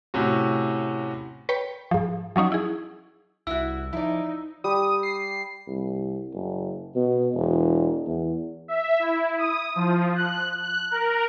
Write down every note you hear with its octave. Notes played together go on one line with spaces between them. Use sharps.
A2 C3 C#4 F#4
B4 C#5 G5 B5
G#2 F3
F3 F#3 C#4 D#4
E4 G#4
C2 E4 F#4 E6
F3 D#4 E4 D5
G3 D#6
C7
C2
F#1
B2
E1
E2
E5
E4
D#6
F3
F#6
F#6
A#4